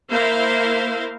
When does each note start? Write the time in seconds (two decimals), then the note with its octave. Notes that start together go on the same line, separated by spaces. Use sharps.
0.10 A#3 E4 A#4 C5 F5